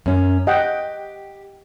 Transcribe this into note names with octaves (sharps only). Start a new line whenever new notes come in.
F#2 C#4
G4 D#5 F#5 G5